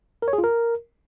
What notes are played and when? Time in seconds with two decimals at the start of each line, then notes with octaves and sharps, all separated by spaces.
0.22 A#4
0.28 C#5
0.33 G#4
0.38 F4
0.44 A#4